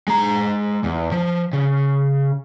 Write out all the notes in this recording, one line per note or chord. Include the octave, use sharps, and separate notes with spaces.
G#3 A#5
E2
F3
C#3